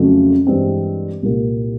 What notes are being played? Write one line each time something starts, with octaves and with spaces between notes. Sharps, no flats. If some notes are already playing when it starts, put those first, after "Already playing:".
Already playing: F2 C#3 F#3 A3
G2 E3 G#3 C4
C2 A#2 G3 A#3